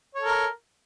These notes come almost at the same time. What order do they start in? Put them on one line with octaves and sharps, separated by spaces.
C#5 A4 A#4